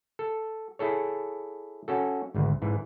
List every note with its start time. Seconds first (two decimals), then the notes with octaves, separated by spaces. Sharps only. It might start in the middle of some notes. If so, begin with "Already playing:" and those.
0.19 A4
0.79 E4 G#4 A4 C#5
1.88 C#4 F#4 A4
2.34 G#1 D2
2.62 G#2 E3